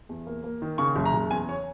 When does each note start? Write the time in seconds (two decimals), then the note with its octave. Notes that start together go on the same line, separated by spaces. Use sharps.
0.09 E2
0.27 A#3
0.44 A#3
0.62 D#3
0.78 C#3 C#6
0.96 F#1
1.06 A#5
1.14 F#1
1.31 E2 G#5
1.49 C#5